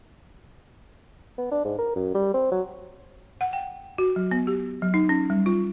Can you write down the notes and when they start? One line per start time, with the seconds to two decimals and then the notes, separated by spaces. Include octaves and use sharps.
1.38 B3
1.52 D4
1.65 G#2
1.79 A#4
1.96 F#2
2.15 G3
2.34 C4
2.52 F#3
3.41 F#5
3.53 G5
3.98 F#4
4.16 F#3
4.31 B3
4.47 G4
4.82 F#3
4.94 D#4
5.09 C#4
5.30 G3
5.46 F4